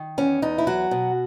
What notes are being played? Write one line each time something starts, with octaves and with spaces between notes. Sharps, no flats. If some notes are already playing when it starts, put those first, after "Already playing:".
Already playing: D#3
E2 C#4
E2 D#4
E4
F#3 F#4
B2